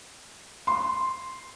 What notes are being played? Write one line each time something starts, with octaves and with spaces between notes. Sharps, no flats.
C6